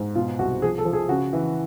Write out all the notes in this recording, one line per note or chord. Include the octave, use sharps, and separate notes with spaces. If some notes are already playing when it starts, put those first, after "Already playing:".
Already playing: G#2
B2 F4
C2 F#4
F3 G#4
A4
F3
G#4
C#3 F#4
E3